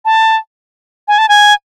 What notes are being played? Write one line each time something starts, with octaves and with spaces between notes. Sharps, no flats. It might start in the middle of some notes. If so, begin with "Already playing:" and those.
A5
G#5
A5
G#5